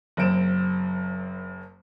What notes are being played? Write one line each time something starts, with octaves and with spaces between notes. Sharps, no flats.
F#1 F#2 C4 D7 E7